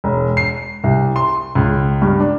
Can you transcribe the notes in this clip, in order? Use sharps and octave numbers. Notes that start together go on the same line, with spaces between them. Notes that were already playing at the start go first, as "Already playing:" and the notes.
E1
C7
C2
C6
C#2
G2
D4